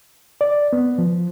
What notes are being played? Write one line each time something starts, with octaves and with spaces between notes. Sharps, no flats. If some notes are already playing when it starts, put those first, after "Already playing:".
D5
B3
F3